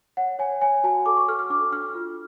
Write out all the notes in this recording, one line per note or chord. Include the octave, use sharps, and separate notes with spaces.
C#5 F#5
C#5 G#5
C#5 G#5
F#4 A5
A4 D6
C#6
A4 F6
F6
D4 D6
D4 F6
F4